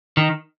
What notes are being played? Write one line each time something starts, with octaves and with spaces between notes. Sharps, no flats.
D#3